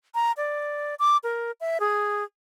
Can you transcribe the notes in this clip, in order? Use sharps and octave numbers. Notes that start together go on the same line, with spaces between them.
A#5
D5
D6
A#4
E5
G#4